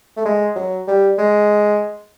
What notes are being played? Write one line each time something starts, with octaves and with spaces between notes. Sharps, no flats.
A3
G#3
F#3
G3
G#3